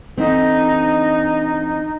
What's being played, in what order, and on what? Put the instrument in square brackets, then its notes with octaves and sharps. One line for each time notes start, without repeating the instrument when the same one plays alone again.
[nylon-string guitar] D3 E3 C4 [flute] D#4